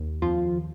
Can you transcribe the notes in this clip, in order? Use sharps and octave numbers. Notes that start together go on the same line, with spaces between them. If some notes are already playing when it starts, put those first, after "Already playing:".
Already playing: D#2
F2 F3 F4